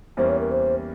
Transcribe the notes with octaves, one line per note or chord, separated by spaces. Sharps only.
E2 E3 G3 A#3 C#4 C5
C#5
A#4
C5